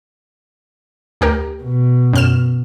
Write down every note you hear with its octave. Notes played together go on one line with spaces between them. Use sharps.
D2 G4 A#4
B2
F#2 F6 E7